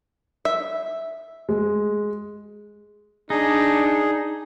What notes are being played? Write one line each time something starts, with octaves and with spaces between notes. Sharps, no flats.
E5
G#3
D4 D#4 G#4